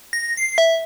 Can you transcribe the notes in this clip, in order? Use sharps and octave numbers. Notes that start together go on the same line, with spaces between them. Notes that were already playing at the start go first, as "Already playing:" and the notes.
A#6
C7
E5